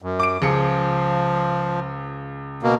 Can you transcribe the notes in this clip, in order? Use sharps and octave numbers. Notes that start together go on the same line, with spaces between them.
F#2
D6 D7
C#2 F3 G#4 C#7
B2 A#3